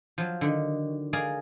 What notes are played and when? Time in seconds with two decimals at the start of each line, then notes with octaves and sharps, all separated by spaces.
0.18 F3 F#3
0.41 D3 D#3
1.13 G#4 A#4 D5 F5 G#5